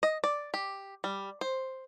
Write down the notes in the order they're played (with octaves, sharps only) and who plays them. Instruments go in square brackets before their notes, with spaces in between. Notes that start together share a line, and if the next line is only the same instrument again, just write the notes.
[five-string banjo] D#5
D5
G4
G3
C5